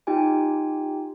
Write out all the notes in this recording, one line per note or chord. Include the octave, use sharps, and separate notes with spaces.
D#4 F4 G4 G5 G#5